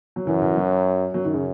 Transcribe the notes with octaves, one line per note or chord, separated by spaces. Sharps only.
F#3
F#2 E3
E3
F#3
F#2 F#3
D#3
C#3